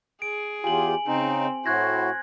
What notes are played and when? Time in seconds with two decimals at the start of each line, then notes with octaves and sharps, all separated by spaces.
0.22 G#4 D7
0.64 E2 F4 G4 G#5 F#7
1.07 C#3 C4 D#4
1.66 A2 E4 F#4 C5 F#6 G#6 A#6